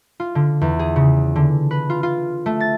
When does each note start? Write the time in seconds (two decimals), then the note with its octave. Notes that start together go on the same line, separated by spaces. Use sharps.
0.20 F4
0.35 D3
0.61 E2
0.79 G#4
0.96 C#3
1.36 D3
1.71 B4
1.90 F4
2.03 F4
2.46 A3
2.60 A6